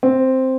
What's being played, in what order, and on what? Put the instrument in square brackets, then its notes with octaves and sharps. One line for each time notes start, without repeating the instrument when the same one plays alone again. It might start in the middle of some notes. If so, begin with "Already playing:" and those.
[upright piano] C4